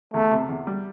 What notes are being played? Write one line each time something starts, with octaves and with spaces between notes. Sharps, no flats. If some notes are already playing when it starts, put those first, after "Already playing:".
E2 A3
C3
E2
G3